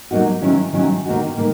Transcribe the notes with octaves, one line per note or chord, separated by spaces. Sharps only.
F#3 A#3 D#4 F#4
D#3 F#3 C#4 E4
D#3 F#3 C#4 E4
D#3 A#3 D#4 F#4
D#3 A#3